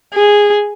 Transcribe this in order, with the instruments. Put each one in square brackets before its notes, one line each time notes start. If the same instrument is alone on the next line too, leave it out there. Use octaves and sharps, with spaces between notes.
[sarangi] G#4